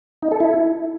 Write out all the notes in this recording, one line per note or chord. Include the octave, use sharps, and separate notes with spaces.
D#4
A4
E4